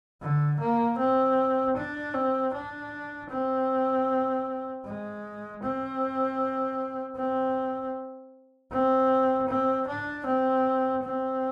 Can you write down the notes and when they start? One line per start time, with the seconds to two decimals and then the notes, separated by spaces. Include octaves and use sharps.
0.22 D3
0.60 A#3
0.99 C4
1.76 D4
2.14 C4
2.54 D4
3.31 C4
4.85 G#3
5.63 C4
7.16 C4
8.72 C4
9.48 C4
9.87 D4
10.26 C4
11.04 C4